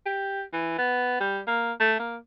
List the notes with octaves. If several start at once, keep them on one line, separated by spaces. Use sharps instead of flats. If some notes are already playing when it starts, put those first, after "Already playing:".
G4
E3
B3
G3
A#3
A3
A#3